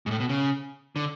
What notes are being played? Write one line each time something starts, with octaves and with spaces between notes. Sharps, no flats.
G#2
A2
B2
C#3
D3